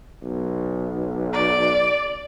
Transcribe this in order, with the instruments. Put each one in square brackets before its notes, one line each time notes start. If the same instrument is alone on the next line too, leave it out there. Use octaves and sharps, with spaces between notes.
[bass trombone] B1
[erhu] D5